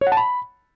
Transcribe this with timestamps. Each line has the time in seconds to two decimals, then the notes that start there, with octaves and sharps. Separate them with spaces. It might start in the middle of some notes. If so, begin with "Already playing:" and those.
0.01 C#5
0.07 F#5
0.12 A5
0.17 B5